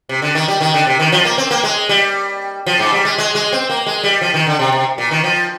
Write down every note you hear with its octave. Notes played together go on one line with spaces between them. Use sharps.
C3
D3
D#3
G3
D#3
D3
C3
D#3
F3
A#3
C4
A#3
G#3
G3
F3
G#2
G3
G#3
G#3
G#3
C4
A#3
G#3
G3
F3
D#3
D3
C3
C3
A#2
D#3
F3